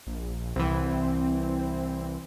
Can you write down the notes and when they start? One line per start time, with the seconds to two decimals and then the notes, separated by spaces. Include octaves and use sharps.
0.07 A#1
0.56 C2 E3 C4